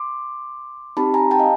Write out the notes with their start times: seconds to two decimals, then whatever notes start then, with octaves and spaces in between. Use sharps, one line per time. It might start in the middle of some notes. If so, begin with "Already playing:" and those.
Already playing: C6 D6
0.97 C4 D#4 G4 A5 B5
1.14 G#5 A#5
1.31 G5 A5
1.39 D#5 F5